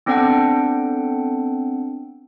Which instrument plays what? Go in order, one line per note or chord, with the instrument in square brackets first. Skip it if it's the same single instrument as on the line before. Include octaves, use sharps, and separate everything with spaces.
[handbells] B3 C4 D4 A4 F#5 G5